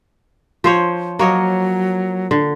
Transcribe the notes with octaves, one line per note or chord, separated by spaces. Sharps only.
F3 C5 C#5
F#3 A#3 C#5 D#5
D3